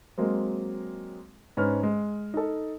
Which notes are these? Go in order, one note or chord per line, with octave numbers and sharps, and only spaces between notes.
F#3 G#3 A#3 C4
G#2 C#4 B4 F6
G#3
D#4 A4